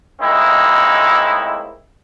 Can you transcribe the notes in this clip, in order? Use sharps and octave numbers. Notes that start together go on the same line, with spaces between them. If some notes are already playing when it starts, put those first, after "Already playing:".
A2 G#3 A#3 C4 D#4 E4